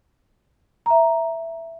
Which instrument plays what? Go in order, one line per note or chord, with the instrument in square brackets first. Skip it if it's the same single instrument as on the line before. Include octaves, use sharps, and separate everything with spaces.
[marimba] E5 A#5